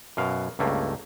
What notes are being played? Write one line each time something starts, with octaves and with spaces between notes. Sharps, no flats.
F#2 B2 F5
C#2 G2 A3 A#3